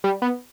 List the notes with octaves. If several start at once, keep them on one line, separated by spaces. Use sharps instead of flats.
G3
B3